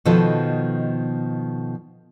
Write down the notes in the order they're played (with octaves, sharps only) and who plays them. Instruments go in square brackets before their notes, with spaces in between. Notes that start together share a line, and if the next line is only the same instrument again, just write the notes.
[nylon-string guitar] B2 D#3 F3 A4 D#5